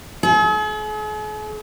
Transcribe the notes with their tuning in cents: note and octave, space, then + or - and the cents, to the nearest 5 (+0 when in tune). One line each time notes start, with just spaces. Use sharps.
G#4 +45